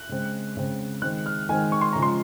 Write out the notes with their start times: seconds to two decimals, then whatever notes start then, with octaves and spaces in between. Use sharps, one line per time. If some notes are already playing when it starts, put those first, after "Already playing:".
Already playing: F#6
0.09 C#3 G#3 C4
0.57 C#3 G#3 C4
1.02 D#3 G#3 C4 F#6
1.26 F6
1.49 D#3 G#3 C4 G#5
1.72 C#6
1.81 C6
1.93 C#3 F3 G#3 A#5
2.02 C6